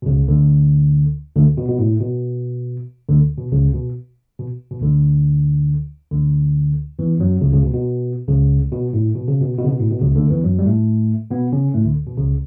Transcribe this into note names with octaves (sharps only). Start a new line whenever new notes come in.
B2
C#2 C#3
D2 D3
D2 D3
B2
B2
A2
B2
D2 D3
B2
C#2 C#3
B2
B2
B2
D2 D3
D2 D3
E2 E3
F#2 F#3
C#2 C#3
C#2 C#3
B2
B2
C#2 C#3
B2
A2
B2
C#3
B2
B2
C#3
B2
A2
B2
C#2 C#3
D2 D3
E2 E3
F#2 F#3
G3
A2 A3
B2 B3
C#3 C#4
A2 A3
D2 D3
B2
C#2 C#3